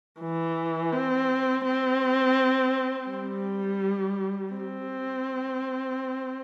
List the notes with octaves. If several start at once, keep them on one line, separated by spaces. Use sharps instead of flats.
E3
C4
C4
G3
C4